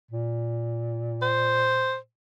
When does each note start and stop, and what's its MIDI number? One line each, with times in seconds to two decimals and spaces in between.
0.11 2.04 46
1.22 1.96 72